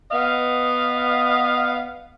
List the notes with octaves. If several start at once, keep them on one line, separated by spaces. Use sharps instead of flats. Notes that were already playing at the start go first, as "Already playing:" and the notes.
B3 D#5 F5